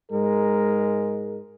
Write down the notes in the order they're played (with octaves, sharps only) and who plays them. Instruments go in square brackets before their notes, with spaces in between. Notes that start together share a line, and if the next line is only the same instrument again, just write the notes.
[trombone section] G#2 G#3 A#4